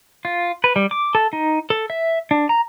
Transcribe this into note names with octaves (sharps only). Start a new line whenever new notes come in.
F4
B4
G3
D6
A4
D#4
A4
E5
D4
A#5